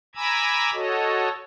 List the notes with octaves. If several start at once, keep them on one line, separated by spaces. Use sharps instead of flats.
G#5 A#5 B5 D6 E6 G#6
F#4 A4 C#5 D#5